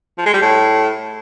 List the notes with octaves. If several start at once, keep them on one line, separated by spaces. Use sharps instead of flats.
F3
G#3
G3
A2